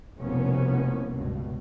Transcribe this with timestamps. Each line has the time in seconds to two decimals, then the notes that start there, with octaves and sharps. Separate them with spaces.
0.19 F1 C2 B2 A#3 B3 C#4
1.09 C#2 G2 B2